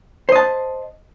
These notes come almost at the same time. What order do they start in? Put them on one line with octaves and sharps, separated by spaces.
C5 D#5 A5